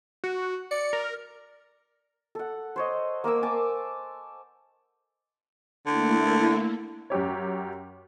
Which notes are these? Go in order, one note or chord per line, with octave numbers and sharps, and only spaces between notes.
F#4
D5 C#7
A#4
A4 F#5
C5 C#5 D#5
A#3 A#4 D6 E6
G#5 A5 D6
D3 A3 A#3 E4
F#2 C#4 G4 C#5